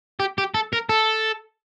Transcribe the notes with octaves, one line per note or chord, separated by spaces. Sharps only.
G4
G4
A4
A#4
A4